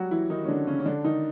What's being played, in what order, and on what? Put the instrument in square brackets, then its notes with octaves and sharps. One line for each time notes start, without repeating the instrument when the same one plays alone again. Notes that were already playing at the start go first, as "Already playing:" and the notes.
Already playing: [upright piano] F#3 G3 F#4 G4
E3 E4
D#3 D#4
C#4
D3 D4
C#3 C#4
C#4
D3 D4
D#3 D#4